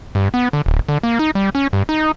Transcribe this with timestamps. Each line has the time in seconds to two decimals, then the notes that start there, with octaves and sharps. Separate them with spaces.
0.15 G2
0.34 B3
0.53 D3
0.66 D1
0.89 D3
1.03 A#3
1.19 D#4
1.35 G3
1.55 C#4
1.73 G2
1.89 D#4